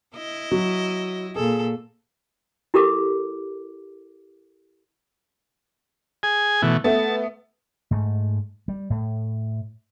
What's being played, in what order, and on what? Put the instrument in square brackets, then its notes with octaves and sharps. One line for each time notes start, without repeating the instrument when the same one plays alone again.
[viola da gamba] E4 D#5
[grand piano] F#3
[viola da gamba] A#2 A4 [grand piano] G#4
[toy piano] E4 G4 A4 A#4 D6
[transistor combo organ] G#4 G#5
B2 E3 A3
[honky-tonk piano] A3 B3 [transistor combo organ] A5
[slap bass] G#2 A3
G3
A2